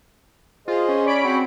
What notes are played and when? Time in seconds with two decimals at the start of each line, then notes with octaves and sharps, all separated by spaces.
0.68 F4 G#4 C5 D#5
0.89 C#4
1.05 C#5 D5 B5 D7
1.25 C4 F#4 F#5